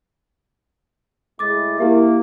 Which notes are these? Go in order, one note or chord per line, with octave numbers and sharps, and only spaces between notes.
A2 G#3 E4 D6 A6
A#3 E4 G4 E5